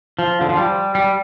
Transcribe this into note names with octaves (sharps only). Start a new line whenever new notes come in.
F3
D3
F3
G3
G3